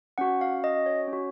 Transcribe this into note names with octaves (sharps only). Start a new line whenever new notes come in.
C#4 F#4 F#5
F5
D#5
C#5
C#4
F#4